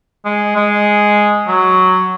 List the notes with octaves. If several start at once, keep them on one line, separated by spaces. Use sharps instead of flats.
G#3
G#3
F#3